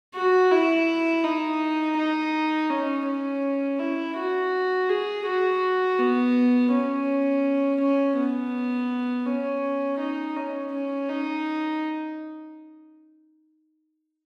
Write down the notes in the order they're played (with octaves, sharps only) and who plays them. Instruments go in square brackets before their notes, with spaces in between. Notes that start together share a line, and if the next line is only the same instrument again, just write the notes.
[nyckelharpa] F#4
E4
D#4
D#4
C#4
C#4
E4
F#4
G#4
F#4
B3
C#4
C#4
B3
C#4
D#4
C#4
C#4
D#4